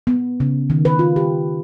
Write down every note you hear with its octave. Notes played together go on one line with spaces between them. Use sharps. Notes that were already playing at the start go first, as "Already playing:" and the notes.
B3
C#3
D#3
B4
F4
G4